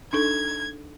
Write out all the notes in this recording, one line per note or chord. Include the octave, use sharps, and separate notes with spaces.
D4 D#4 A4 G#6